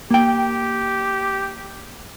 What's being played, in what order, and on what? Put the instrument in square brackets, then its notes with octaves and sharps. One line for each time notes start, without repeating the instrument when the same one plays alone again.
[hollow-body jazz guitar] A#3 G5 [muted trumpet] G4